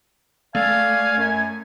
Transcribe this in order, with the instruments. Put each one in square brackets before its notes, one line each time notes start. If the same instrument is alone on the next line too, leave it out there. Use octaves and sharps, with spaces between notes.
[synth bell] A3 [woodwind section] D5 F5 [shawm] G#5
[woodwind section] F#2